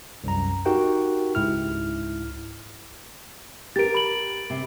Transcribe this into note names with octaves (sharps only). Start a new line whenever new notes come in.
C2 F#2 A#5
D#4 F#4 G4 A#4 F#5 G5
C#2 G#2 E4 F6
G4 A#4 A6 D7
B5 F#7
C3